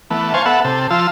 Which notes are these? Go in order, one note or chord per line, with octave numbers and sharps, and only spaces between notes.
E3 A3 B3
C5 F5 G#5 A5 C#6
B3 A4 E5 F#5
C3 A4
F3 F4 A5 E6